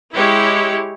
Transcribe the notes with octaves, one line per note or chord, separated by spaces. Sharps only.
G#3 E4 G4 C#5